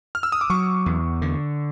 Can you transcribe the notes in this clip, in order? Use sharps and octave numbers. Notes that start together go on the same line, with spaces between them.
F6
E6
D#6
D6
F#3 C#6
E2
D3